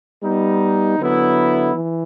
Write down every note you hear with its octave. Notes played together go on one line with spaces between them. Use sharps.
G3 B3 D#4
D3 F#3 B3 E4
E3